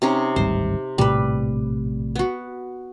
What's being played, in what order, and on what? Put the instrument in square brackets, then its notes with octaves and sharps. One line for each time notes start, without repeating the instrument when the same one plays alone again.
[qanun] C3 C#4 D#4
[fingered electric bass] D1 G#1 G3 [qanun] C5
[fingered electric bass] A#1 A2 C3 [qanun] G3 B4
[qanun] B3 F#4